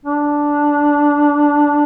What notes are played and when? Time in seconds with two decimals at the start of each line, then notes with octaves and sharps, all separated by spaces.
0.05 D4